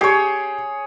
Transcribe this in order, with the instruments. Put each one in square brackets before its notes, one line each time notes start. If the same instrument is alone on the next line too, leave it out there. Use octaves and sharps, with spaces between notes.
[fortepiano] G4 [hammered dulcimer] G#4 C#5